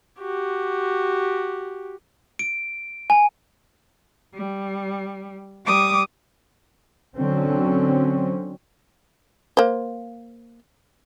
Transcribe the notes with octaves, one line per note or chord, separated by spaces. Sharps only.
F#4 G4
D7
G#5
G3
G3 D6 D#6
D3 F#3 C4 C#4
A#3 C5